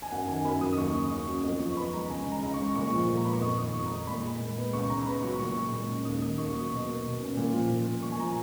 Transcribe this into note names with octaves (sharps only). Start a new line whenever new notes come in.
G#5
F#2 F#5
D#3 G#5
F#2 B5
F#3 D#6
D#6
D#2 C#6
C#3
D#6
C#4 C#6
F#3
F2 D#6
F3 C#6
C#6
B3 B5
G#3 A#5
C#2 G#5
C#3
A#5
C#2
C#6
G#3
A#2 C#6
F3
A#2
A#5
B3 B5
C#6
F2 D#6
D#3 D#6
C#6
F2
A#5
G#3
A#2 B5
G#3
A#2
B3
C#2 C#6
C#3 A#5
B3 B5
F#3 C#6
A#2 C#6
G#3
A#2
C#4
D#2 D#6
D#3 D#6
D#2 C#6
F#3 C#6
B2
A#3
B2
C#4
A#2
F3
A#2
A#3
A#2 C#6
G#5
F3 A#5